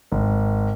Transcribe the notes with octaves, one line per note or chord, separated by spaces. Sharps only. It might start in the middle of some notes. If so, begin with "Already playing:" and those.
G#1